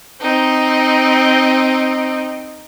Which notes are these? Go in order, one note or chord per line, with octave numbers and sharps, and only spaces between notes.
C4 D#4